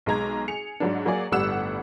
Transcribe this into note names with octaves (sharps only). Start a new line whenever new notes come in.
B1 G#3 A#5 G#6
G#4 C#7 F7
G#2 F#3 D4
F#3 A#3 G#4 D5
G1 A2 G3 F#5 E6 E7